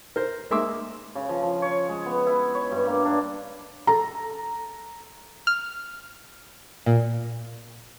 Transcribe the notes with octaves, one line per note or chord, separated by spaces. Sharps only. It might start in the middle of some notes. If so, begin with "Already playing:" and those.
A#4 C5
G#3 A#3 E5 C6 D6 E6
C#3
F3
F3
C#5
G#3
B3
E4
C#5
G2
A#3
D4
A4 A#5
F6
A#2